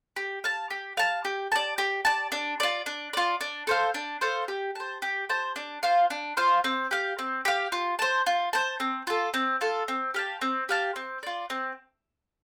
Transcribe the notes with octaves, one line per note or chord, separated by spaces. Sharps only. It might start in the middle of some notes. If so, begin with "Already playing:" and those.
G4
F5 A5
G4
F5 A5
G4
D5 A5
G4
D5 A5
D4
F4 D5
D4
F4 D5
D4
A4 C5 F5
D4
A4 C5 F5
G4
C5 A5
G4
C5 A5
D4
F4 C5 F5
D4
F4 C5 F5
C4
G4 F5
C4
G4 F5
F4
C5 A5
F4
C5 A5
C4
F4 A4
C4
F4 A4
C4
G4 F5 A5
C4
G4 F5 A5
C4
F4 D5
C4